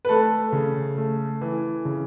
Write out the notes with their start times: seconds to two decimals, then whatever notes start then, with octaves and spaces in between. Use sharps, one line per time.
0.05 B4
0.09 A3 A4
0.52 C#3
0.97 A3
1.41 E3
1.85 C#3